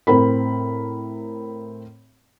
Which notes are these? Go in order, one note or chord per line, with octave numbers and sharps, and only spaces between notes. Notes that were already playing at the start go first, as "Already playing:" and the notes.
A2 C4 A#4 B5